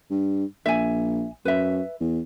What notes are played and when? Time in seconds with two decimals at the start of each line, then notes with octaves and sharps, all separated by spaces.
0.11 G2
0.66 A#1 E5 G#5
1.45 F#2 B4 E5
2.01 E2